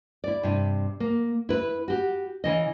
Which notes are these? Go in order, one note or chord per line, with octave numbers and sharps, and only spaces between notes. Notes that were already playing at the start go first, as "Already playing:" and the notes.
E4 D5
G2 C3
A#3
E4 B4
F#4 G4
C#3 E3 D#5